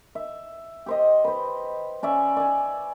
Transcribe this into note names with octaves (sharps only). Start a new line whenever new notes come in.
E5
G4 C5 D#5
B4 C5
C#4 D5 E5
D5 G#5